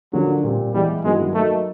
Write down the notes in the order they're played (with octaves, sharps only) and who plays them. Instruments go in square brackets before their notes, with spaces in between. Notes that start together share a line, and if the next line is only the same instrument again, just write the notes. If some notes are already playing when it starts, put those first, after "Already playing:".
[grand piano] D3 F3 A#3 D4 [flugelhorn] F#3
[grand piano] A#2 G3 C4
[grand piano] E3 G#3 B3 E4 G#4 [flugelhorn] G3
[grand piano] G2 D#3 F#3 B3 E4 [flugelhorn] G#3
[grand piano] F#3 A#3 D#4 [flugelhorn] A3